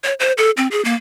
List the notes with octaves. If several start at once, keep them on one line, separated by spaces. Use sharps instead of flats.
C#5
C5
A4
C4
G#4
A#3